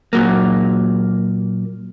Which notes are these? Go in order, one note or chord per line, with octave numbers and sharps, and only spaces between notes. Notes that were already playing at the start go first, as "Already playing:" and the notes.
A#2 F#3 A#3